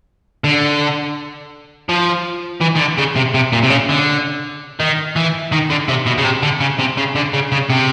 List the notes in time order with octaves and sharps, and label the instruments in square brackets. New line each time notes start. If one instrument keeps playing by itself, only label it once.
[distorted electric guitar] D3
F3
E3
D#3
D3
C#3
C3
C3
A#2
C3
C#3
D3
D#3
E3
D#3
D3
C3
B2
C#3
C3
D3
C#3
C3
C#3
D3
C#3
C#3
C3